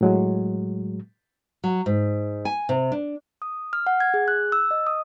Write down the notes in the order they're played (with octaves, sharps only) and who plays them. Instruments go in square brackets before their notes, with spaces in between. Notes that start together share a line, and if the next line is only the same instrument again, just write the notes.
[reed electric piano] A2 F#3 G#3
[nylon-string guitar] F#3
G#2
G#5
C3
D4
[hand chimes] D#6
F6
F#5
G#6
G#4
F#6
E6
D#5
D#6